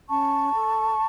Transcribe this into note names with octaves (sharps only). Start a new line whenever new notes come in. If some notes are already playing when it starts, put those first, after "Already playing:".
C#4 A5 C#6
A4